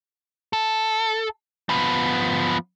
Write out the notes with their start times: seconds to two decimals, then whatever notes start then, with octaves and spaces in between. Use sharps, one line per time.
0.53 A4
1.69 F3 B3